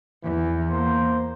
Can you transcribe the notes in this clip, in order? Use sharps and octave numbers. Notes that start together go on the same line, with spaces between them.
E2 E3
A#3 C5